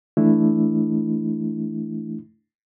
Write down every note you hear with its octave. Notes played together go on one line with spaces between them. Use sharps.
E3 A3 D4 E4